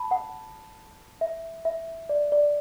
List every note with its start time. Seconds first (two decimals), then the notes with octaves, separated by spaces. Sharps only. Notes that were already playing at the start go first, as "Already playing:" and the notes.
Already playing: A5 B5
0.11 F#5
1.21 E5
1.65 E5
2.09 D5
2.32 D5